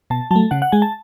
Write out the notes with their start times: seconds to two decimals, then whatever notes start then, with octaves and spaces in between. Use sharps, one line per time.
0.10 B2 A5
0.31 F#3 A3 A5
0.51 C#3 F#5
0.62 F#5
0.72 G#3 G#5
0.82 A5